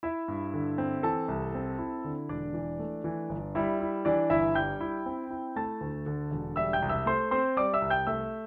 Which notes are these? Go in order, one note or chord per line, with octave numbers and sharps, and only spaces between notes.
E4 E5
G2
D3
C4
E3 A4 A5
C2
C4
E4
D3
E1 D4 D5
E3
A3
E3
G1
G3 E4 E5
E4
E3 D4 D5
G1 E4 E5
G3 G5 G6
E4
C4
E4
A3 A5 A6
D2
D3
E1
G3 E5 E6
G5 G6
C2
E5 E6
A3 C5 C6
C4 C5 C6
G3 D5 D6
E5 E6
C2
G5 G6
A3 E5 E6